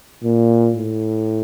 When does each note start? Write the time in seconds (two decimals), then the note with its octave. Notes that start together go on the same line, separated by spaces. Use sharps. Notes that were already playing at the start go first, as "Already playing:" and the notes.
0.23 A#2
0.76 A2